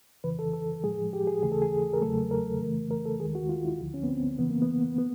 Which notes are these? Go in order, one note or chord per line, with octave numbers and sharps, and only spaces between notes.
F2 C#3 E3 B4
A4
A4
A2 F3 G#3 G#4
G4
G#4
D#2 C#3 E3 A3 G#4
A4
G#4
A#4
E2 C#3 F#3 A3 A4
A#4
F2 C#3 E3 A3
A#4
A4
D#2 D#3 G#3 G#4
F#4
F4
E4
D2 D3 F3
C#4
B3
C4
F2 C#3 E3 B3
A#3
B3
B3